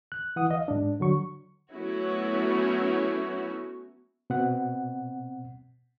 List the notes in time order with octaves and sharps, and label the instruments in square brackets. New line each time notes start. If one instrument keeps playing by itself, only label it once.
[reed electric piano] F#6
E3 F#5 D#6
D#5 F5
G#2 D4
D3 F#3 C#6
[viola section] F#3 A3 B3 C#4 E4 F#4
[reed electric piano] B2 C4 F#5